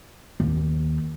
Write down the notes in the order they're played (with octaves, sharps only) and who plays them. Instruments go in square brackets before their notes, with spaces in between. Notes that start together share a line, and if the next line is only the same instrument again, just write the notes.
[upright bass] D#2